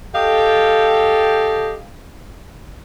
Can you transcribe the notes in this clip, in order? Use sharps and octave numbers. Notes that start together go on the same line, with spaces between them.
G4 A4 D#5 F5 G5